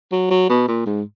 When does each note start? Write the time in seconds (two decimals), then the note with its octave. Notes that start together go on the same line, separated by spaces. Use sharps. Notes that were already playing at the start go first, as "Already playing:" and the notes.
0.12 F#3
0.31 F#3
0.49 B2
0.68 A#2
0.86 G#2